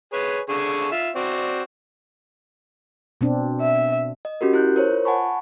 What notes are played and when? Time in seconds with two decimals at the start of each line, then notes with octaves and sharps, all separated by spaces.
0.13 G#4 B4 C#5
0.49 D3 G#4 C#6
0.92 F4 E5
1.15 C4 F#4 D5
3.21 B2 C4 D4
3.61 E5
4.25 D#5
4.41 C#4 F#4 G4 A#4
4.53 E4 F#6 G6
4.76 A#4 C5 C#5
4.91 F4
5.05 F#5 G#5 A5 B5 C#6